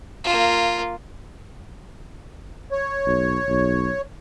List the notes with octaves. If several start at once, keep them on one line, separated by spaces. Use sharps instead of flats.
A#3 F4
C#5
B1
B1